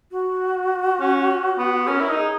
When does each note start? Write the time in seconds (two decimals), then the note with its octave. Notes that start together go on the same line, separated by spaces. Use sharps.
0.11 F#4
1.00 C#4
1.58 B3
1.88 C#4 A#4
2.01 E4
2.11 D#4
2.18 G#4